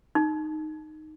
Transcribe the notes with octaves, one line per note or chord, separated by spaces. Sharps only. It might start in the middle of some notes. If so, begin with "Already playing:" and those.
D#4